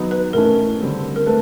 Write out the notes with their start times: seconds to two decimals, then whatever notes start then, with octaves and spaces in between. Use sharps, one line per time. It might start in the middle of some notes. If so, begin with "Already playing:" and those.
Already playing: F#3 B3 D#4
0.11 B4
0.33 A2 E3 A3 C#4 A#4
0.80 D3 G3 C4
1.16 A#4
1.26 A3 B4